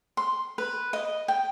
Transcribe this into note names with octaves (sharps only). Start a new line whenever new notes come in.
C6
B4
D#5
G5